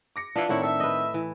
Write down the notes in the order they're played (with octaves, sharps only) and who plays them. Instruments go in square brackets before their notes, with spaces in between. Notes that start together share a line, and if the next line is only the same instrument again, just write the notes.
[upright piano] D6 A#6 C#7
[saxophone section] E3 B3 [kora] D4 [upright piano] F4
[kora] A2 F#5 [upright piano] D#3 C4 [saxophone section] E4 C#5
[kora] A4 [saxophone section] E5
[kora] B4 D#5
E3